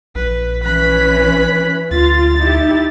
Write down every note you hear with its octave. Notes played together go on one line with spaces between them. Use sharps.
A#1 B4
E3 C#4 B4 B5 F#6
D2 F4 A6
D#4 E4 G4